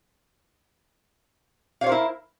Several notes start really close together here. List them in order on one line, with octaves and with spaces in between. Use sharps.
F5 C#5 C5 A#4 E4